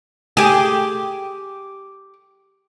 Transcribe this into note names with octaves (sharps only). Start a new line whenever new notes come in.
G4 G#4